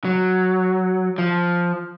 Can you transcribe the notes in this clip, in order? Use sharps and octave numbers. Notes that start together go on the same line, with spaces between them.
F#3
F3